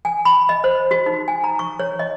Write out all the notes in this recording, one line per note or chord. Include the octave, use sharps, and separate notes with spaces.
G#5
B5
D#5
C5
F#4
D#4
G#5
A#5
C#6
C#5
D#5